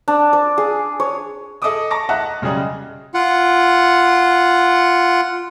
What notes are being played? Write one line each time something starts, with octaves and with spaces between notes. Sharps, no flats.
D4
D5
G#4
C#5
G#4 A4 D#5 E5 D6 D#6
A5 A#5 C#6 D6 A#6
D#5 E5 F#5 A5 A#5 F#6
F#2 C#3 G3 G#4 D#5
F4 F#5